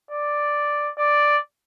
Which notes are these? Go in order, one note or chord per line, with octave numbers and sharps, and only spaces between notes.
D5
D5